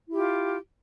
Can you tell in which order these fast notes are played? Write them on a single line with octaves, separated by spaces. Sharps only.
E4 G4 F4